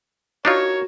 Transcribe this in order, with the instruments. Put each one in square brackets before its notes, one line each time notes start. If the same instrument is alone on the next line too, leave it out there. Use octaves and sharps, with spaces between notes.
[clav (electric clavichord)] D4 D#4 F4 [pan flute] F#4 [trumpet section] A#4 C#5